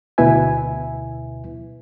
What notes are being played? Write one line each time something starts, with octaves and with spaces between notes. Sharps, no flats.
D2 B2 E4 B4 E5 G#5